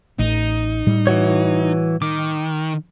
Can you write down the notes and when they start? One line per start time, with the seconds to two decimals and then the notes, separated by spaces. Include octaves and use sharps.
0.19 A1 D#4
0.86 A2 G3
1.07 E3 F#4 C#5
2.02 D#3 D6